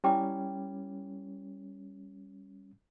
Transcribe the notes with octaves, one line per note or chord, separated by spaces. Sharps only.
G3 C#4 E4 G5 D6